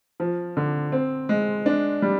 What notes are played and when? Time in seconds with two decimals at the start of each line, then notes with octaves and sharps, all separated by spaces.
0.20 F3
0.57 D3
0.92 C4
1.29 G#3
1.66 D4
2.02 G3